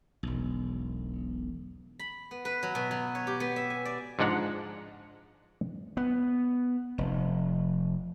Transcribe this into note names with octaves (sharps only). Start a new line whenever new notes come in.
E1 B1
B5
B3
B4
F#3
B2
F#3
C#5
G4
B3
E5
G#5
D5
G#2 F3 G#3 D4 F#5 A#5
B3
F1